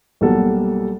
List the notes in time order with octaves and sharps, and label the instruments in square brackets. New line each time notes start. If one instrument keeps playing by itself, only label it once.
[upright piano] B1 G3 A#3 A4 F#5